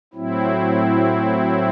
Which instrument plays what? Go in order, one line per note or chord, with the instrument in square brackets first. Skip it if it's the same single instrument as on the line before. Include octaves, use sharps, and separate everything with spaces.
[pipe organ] A2 F#3 C4 E4